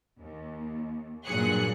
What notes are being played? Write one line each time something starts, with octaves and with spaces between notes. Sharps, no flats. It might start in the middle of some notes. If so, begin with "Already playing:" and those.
D#2
G2 A#2 F#3 G#4 F#6 C#7